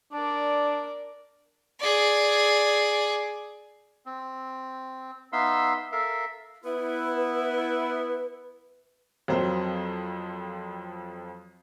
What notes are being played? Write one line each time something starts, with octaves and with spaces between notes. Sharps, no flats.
D4 A#4 D5
G#4 D5
C4
B3 D#4 E5 F5 C6 E6
A4 A#4 E5 F5
B3 E4 B4
F2 F#3 A#3 C4